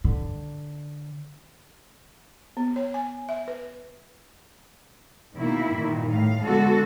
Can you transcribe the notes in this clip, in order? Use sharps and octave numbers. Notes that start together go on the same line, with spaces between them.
D3
B3
C#5
G#5
E5
B4
B2 D#3 A#3 E4
G2 A#2 D#3
A2 F5
D3 G#3 B3 F#4 A4